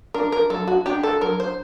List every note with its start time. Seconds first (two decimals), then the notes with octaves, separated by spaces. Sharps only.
0.14 D4 A#4
0.32 A#4
0.50 F#3 A4
0.68 F#4
0.86 D4 G4
1.03 A4
1.21 F#3 A#4
1.40 C5